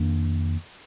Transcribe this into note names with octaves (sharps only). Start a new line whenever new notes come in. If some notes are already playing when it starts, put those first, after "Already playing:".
Already playing: F2 D#3 A#3 D4